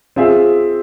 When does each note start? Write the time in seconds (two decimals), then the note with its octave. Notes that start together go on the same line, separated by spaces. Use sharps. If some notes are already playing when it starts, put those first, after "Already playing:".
0.16 C4 F4 G#4 E5